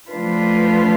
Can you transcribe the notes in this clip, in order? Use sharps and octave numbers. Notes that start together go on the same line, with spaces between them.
F3 A3 D4 F4 B4